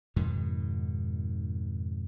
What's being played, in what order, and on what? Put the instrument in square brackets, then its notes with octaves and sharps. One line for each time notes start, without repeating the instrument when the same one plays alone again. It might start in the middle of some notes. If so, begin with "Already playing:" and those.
[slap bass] F2 G#2 B2 D#3